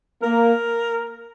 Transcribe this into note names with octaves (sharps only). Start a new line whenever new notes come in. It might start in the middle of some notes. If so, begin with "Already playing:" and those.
A#3 A#4